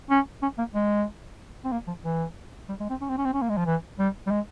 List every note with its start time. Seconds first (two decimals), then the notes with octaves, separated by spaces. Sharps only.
0.10 C#4
0.42 C#4
0.58 A#3
0.74 G#3
1.64 C4
1.72 A#3
1.87 F3
2.05 E3
2.69 G3
2.80 G#3
2.90 C4
3.01 C#4
3.09 C4
3.18 C#4
3.25 C4
3.34 C#4
3.42 A#3
3.49 G#3
3.57 F3
3.66 E3
3.99 G3
4.26 G3
4.30 G#3